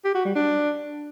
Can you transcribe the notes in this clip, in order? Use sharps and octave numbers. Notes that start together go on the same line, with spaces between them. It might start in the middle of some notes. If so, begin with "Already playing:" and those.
G4
F#4
G3
D4